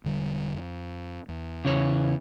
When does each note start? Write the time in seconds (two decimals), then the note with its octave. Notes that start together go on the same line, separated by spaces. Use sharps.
0.04 E1 D3 G3
0.54 F2
1.29 E2
1.65 C#3 E3 C#5